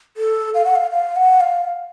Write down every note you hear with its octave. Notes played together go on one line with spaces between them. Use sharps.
A4
F5
F#5
F5
F5
F#5
F5